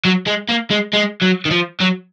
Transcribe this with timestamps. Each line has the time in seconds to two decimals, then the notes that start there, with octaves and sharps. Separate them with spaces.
0.05 F#3
0.27 G#3
0.49 A#3
0.71 G#3
0.93 G#3
1.22 F#3
1.45 D#3
1.51 F3
1.80 F#3